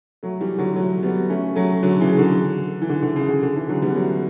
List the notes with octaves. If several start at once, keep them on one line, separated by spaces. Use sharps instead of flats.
F#3 A3
E3 G3
D3 F#3
F#3 A3
G3 B3
A3 C#4
F#3 A3
D3 F#3
C#3 E3
D3
E3
D3
D3
C#3
D3
D3
C#3 E3
D3 F#3
G3 B3
F#3 A3